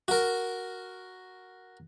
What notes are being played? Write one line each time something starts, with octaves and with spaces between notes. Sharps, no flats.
F#4 A#4